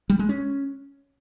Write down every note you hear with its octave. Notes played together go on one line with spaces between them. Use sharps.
G3
G#3
C#4